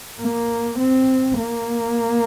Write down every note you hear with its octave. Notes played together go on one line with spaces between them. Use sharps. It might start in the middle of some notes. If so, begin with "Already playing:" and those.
A#3
C4
A#3